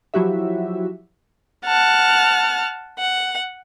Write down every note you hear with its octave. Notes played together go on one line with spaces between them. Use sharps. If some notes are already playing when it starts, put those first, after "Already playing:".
F3 F#3 E4 F#4 G4 E5
F#5 A5 F6
F#5